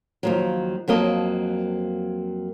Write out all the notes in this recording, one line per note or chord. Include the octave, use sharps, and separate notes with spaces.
D#2 F3 F#3
F2 F#3 A#3 D#5 A5